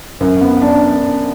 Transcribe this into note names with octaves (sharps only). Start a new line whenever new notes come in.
F#2
B3
D4